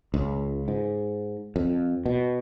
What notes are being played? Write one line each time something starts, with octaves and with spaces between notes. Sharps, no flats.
C#2
G#2
F2
B2